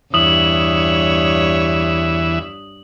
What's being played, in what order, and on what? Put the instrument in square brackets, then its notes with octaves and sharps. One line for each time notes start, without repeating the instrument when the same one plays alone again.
[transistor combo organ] E2 E3 E5 [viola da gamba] G2 C#5 [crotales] D#6 F#7